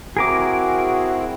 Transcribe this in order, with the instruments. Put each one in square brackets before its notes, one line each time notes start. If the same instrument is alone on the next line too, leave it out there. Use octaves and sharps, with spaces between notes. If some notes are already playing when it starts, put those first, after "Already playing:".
[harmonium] C4 E4 [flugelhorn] F#4 [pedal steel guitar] G#4 A#4 D6